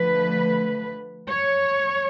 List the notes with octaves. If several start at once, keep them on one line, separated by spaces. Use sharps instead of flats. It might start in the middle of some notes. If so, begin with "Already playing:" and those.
Already playing: D3 F3 A3 B4
C#5